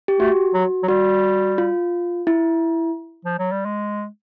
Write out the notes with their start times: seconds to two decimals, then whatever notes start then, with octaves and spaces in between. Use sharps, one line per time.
0.08 G4
0.20 A3 F#4
0.54 F#3
0.83 F#3
0.88 G3 F#4
1.58 F4
2.27 E4
3.25 F3
3.39 F#3
3.52 G3
3.65 G#3